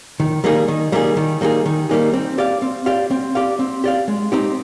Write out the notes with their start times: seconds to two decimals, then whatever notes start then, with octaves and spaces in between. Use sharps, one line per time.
0.20 D#3
0.44 G3 A#3 D#4 G#4
0.68 D#3
0.92 G3 A#3 D#4 G#4
1.17 D#3
1.41 G3 A#3 D#4 G#4
1.66 D#3
1.89 G3 A#3 D#4 G#4
2.13 C4
2.38 G4 D5 F5
2.62 C4
2.86 G4 D5 F5
3.11 C4
3.35 G4 D5 F5
3.59 C4
3.84 G4 D5 F5
4.08 G#3
4.32 C4 D#4 G4